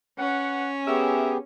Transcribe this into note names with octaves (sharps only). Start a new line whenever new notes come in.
C#4 B4 F#5
F#2 B3 G4 G#4 A#4 E5